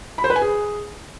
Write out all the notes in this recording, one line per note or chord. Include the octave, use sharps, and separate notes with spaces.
B5
C5
B4
G#5
G#4